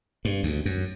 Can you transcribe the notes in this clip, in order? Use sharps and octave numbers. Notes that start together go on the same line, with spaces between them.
G2
D2
F#2